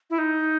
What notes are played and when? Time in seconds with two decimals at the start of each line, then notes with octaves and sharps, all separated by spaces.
0.10 E4
0.18 D#4